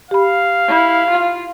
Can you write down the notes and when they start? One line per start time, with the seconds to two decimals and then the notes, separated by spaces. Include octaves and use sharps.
0.11 G4 F5 B5
0.67 E4
1.09 F4